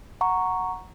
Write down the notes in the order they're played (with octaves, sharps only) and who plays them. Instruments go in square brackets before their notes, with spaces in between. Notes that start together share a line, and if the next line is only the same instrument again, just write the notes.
[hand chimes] F#5 A#5 C#6